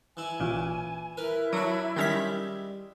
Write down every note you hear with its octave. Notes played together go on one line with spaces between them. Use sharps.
E3 E4 G#5
A1 A#2
E4 A#4 B4
F#3 D4 F#4
D#3 G3 G#3 C#4 E5 B6